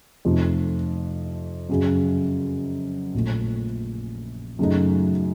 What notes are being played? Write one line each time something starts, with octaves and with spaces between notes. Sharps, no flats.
F2 C3 F3 A3 D#4
F#2 C#3 F#3
A#1 A#2 A3
F#2 C#3 F#3 A3 D#4